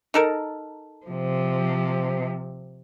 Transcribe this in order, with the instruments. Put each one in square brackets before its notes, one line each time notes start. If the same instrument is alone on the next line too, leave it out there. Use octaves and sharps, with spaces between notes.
[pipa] D#4 A4 A#4
[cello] C3 F3